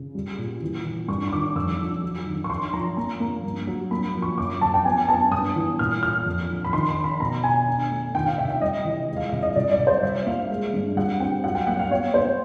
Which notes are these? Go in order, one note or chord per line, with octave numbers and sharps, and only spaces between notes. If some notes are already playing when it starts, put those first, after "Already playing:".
Already playing: C#3
G3
A#2
E3
E3
G2 C#6
C#6
D#3 D6
F2 E6
F3
F#3
D#3
C#6
D3 C6
F3 A#5
A#3 A#5
A#3
G2
F#3
A#3 B5
F3
C#6
F#2 D6
F#2 A5
G5
B3 G#5
B3 A5
G2 D#6
E3
A#2 F6
A#2 F6
F2
F3
B5
D#3 C6
C6
D#3
B5
B2 A#5
B2 G#5
D3
A3
D#3 G5
F5
C3 E5
E5
G3 D#5
E3
G#3
F5
C2 E5
D#5
C2 D5
D5
C2
C5
G3 E5
A#3 F5
G#3
G2
G3 F#5
C4 G5
F#3 F#5
G5
A#3 F#5
F5
B3 C#5
B3 C5